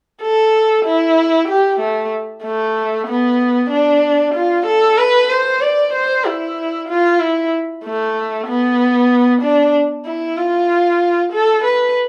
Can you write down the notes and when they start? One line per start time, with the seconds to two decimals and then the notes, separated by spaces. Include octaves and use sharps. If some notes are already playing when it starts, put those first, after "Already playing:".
0.22 A4
0.85 E4
1.49 G4
1.81 A3
2.44 A3
3.08 B3
3.71 D4
4.35 F4
4.66 A4
4.98 B4
5.30 C5
5.61 D5
5.93 C5
6.25 E4
6.89 F4
7.20 E4
7.84 A3
8.47 B3
9.42 D4
10.06 E4
10.38 F4
11.33 A4
11.65 B4